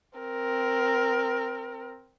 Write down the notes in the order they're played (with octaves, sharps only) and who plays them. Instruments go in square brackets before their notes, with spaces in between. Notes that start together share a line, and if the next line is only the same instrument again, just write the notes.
[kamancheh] C4 A#4